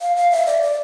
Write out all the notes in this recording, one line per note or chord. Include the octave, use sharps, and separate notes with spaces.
F5
F5
E5
D5
D5